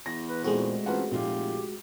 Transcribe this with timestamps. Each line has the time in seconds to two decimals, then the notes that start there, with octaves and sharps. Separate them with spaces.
0.06 E2 A#6
0.29 B4
0.44 A#2 G#3 A3 C4 F#4
0.86 A1 C4 F4 B4 F#5
1.11 F1 A#2 F4 G4